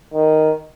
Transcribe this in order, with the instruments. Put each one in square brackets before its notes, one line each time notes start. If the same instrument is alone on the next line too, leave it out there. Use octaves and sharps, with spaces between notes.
[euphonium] D#3